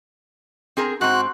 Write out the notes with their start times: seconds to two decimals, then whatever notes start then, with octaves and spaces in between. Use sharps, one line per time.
0.77 C4 G#4 A#4
1.01 G#2 C4 F#4 F#6